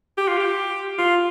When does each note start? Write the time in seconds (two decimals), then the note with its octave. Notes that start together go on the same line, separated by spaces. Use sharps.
0.18 G4
0.28 F4
0.38 G4
0.98 F4